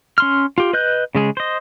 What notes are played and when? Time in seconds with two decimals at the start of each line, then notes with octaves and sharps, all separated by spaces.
0.18 C#4 C6 F6
0.58 F4 G4
0.73 B4 D#5 F#6 G6
1.15 C#3 G#3 G#4
1.37 C5 D#5